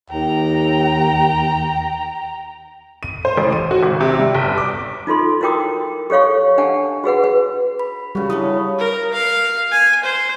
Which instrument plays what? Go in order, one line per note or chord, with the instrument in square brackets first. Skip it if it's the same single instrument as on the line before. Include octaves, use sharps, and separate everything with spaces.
[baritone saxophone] D#2 [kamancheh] G5 A#5
[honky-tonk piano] D#7
C5
A1
D#7
F#4
G#1
C3
G3
G1
D6
[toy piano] D#4 F4 A4 C6
E4 F#4 A#4 G5 D6 D#6
G4 A4 C#5 F5 C#6
D4 G4 F#5 G#5 A5
F#4 G#4 B4 F#5
B4
[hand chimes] B5
[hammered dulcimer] C#3 F#4 [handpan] G3
[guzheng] B3 C#4 D4 [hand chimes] E4 B5 D#6
[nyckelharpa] A#4
F5
G#5
C5